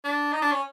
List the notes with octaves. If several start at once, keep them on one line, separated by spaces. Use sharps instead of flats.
D4
D#4
D4
C#4